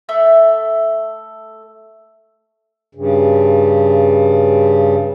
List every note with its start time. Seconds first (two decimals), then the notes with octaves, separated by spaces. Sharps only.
0.09 A3 A4 E5 E6
2.95 G2 C#3